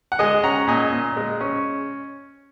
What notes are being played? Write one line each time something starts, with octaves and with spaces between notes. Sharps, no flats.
F#5
G#3 D#5 G#5
C#4 F#5 A#5
A#2 D#5 G#5
A#2
G#3
C#4